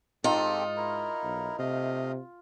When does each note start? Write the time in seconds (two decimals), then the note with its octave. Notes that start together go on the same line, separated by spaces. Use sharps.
0.24 G#2 C4 D#4 F4 G4 A4
0.77 E4 A#4
1.23 B1
1.59 C3 A3 D#5 F5